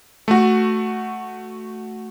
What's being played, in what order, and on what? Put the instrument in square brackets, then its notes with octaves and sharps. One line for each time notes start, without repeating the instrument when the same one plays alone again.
[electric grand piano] A3 F#4